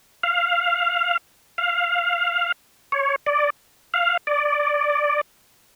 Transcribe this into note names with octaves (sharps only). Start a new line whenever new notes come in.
F5
F5
C#5
D5
F5
D5